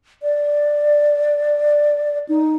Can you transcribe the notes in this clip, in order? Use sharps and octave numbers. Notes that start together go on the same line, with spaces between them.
D5
D#4